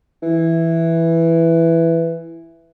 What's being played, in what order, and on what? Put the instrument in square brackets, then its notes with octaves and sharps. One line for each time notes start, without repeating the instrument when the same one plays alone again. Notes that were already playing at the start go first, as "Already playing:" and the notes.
[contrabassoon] E3